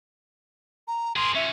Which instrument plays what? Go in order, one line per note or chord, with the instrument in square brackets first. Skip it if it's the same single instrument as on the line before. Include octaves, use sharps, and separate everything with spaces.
[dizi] A#5
[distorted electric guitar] G#4 A#4 [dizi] C6
[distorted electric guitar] F3 C#4 [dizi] E5